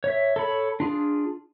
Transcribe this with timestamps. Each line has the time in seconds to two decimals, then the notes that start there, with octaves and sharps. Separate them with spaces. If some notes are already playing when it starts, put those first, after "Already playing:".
0.04 C#5 E5
0.36 A4 C#5 B5
0.80 D4 F4 G#4